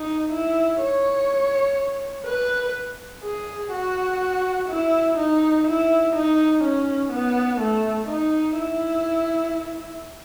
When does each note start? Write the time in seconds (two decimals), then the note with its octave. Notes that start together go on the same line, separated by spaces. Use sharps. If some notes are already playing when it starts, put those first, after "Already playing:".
Already playing: D#4
0.32 E4
0.81 C#5
2.26 B4
3.23 G#4
3.72 F#4
4.69 E4
5.17 D#4
5.67 E4
6.15 D#4
6.64 C#4
7.11 B3
7.61 A3
8.08 D#4
8.58 E4